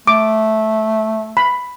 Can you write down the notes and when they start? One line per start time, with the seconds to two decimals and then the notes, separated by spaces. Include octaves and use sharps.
0.07 A3 D6
1.37 B5